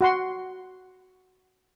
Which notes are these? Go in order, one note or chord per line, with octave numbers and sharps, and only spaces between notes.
F#4 F#5 C6